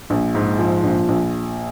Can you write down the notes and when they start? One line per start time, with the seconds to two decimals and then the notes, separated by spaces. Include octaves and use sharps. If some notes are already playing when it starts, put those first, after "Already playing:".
0.10 A#1
0.35 G#2
0.59 F3
0.83 A#1
1.08 A#1